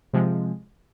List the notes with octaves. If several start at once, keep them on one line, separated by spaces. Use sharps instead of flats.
C3 F3 G#3